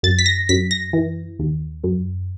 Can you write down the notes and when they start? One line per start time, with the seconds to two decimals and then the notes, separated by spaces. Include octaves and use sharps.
0.03 F#2 A6
0.19 B6
0.26 A#6
0.49 F#2 B6
0.71 A#6
0.93 E3
1.39 D#2
1.84 F#2